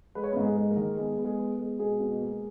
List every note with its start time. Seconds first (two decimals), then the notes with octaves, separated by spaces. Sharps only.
0.15 G#3 B4
0.24 C#5
0.32 G#2 B3 B4
0.43 G#3 G#4
0.57 G#3
0.71 A#3 A#4
0.77 D#3
0.97 G#3 B3 G#4
1.18 B3
1.24 G#3 G#4
1.38 B3
1.59 G#3
1.79 B2 G#3 G#4
2.00 B2
2.21 A#3